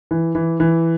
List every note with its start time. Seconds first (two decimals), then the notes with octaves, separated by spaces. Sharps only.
0.11 E3
0.35 E3
0.60 E3